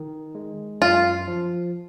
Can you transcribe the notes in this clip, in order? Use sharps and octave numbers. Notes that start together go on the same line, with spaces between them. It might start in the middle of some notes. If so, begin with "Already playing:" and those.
Already playing: D#3
G#3
F#2 F4
F3